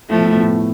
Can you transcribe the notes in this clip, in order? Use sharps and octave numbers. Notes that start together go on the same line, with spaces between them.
A2 F3 A3
B2
A2
B2
A2
B2
A2